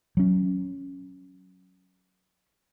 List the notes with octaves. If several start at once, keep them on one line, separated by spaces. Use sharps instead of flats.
F#3 C#4